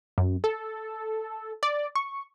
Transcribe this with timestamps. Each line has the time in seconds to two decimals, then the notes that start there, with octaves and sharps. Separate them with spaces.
0.18 F#2
0.44 A4
1.63 D5
1.95 C#6